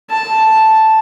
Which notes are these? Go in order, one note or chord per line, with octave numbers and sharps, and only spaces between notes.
A5